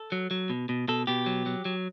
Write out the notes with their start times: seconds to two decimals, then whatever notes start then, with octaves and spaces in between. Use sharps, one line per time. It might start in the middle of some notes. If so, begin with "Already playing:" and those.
Already playing: A4
0.12 F#3
0.31 F#3
0.50 B2
0.69 B2
0.88 B2 A4
1.07 B2 G4
1.26 F#3
1.46 F#3
1.65 F#3